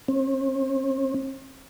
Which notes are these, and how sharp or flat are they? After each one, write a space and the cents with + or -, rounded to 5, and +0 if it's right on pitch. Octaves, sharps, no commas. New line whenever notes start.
C4 +45